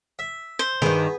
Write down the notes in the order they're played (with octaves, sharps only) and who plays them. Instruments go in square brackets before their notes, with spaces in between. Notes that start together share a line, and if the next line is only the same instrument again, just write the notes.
[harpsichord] E5
[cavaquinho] C5
[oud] G2 D#3 [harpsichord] B3 G#4